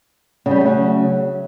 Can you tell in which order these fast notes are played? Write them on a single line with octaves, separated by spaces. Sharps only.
C#3 G3 C#4 A3 F#3